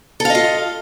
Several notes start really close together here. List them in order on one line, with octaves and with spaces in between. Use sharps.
A4 F5 D#5 F4